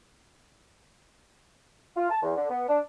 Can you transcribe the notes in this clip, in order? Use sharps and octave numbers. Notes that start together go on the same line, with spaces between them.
F4
A5
E2
D3
B3
D4